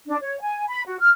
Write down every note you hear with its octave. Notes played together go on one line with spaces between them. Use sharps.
D4
C#5
G#5
B5
F#4
F6